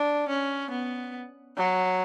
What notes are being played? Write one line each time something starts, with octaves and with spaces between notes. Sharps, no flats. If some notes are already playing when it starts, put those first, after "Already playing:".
Already playing: D4
C#4
B3
F#3